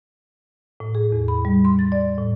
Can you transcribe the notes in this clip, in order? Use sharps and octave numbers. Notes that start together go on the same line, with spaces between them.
A2
G#4
E2
B5
G3
C6
A6
D5
A2